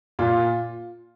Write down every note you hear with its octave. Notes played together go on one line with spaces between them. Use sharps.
A#2 F4